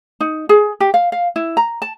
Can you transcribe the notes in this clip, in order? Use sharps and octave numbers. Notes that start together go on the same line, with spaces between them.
D#4
G#4
G4
F5
F5
E4
A#5
A5